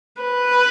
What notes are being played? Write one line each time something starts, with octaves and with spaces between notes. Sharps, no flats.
B4